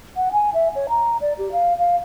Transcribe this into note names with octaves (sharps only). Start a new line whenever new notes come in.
F#5
G#5
E5
C#5
A#5
D5
G4
F5
F5